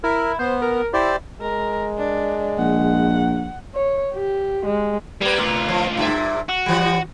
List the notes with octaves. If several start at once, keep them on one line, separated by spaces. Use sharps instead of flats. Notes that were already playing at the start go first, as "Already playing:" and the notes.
E4 A#4
B3 C5
A#4
E4 G4 C5 D5
G#3 A#4
D4
A#1 F#5
C#5
G4
G#3
G3 A#3 B3
D2 F4
F3
G2 A#2 E5
F#4
E3 G3